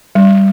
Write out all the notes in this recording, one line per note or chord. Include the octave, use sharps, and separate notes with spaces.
G3